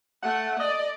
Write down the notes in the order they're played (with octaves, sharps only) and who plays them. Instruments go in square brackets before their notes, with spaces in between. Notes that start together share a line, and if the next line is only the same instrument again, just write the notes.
[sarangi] A3 [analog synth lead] F#5
[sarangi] D5 [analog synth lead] D#5